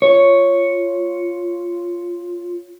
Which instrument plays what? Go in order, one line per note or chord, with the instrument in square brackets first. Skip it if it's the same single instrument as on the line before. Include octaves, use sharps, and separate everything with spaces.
[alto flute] F4 [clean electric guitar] C#5